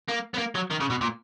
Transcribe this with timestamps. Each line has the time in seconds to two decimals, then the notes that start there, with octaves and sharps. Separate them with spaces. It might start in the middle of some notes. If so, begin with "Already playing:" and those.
0.09 A#3
0.35 B3
0.39 A#3
0.56 F#3
0.71 D#3
0.81 C#3
0.90 B2
1.02 A#2